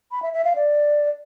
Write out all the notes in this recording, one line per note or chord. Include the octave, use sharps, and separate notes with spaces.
B5
E5
E5
F5
D5